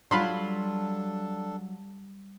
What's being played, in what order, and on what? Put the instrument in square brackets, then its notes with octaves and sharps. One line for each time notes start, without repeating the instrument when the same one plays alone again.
[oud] F#3 [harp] G3 [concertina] D4 A4 [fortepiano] F4 B5 C6